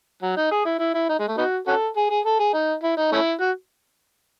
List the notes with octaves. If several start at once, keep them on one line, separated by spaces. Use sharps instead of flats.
F#3
D#4
G#4
E4
E4
E4
D#4
G#3
A3
B3 D#4 F#4
C#4 F#4 A4
G#4
G#4
A4
G#4
D#4
E4
D#4
A3 C#4 E4
F#4